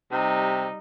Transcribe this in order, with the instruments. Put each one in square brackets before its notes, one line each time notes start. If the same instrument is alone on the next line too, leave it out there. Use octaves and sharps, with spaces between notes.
[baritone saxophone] C3 [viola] G3 D#4